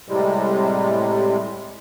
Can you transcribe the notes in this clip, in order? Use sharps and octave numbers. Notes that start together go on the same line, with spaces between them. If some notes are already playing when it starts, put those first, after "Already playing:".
A2 C3 G3 G#3